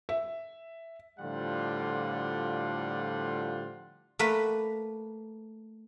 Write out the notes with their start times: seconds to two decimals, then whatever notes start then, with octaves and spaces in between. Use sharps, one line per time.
0.09 E5
1.19 A2 D3 F3 G3 F4 F#5
4.19 A3 A#3 A#4 B4